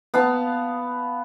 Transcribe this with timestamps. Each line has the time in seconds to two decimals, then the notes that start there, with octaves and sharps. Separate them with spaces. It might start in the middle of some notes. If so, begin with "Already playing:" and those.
0.14 B3 F5 A5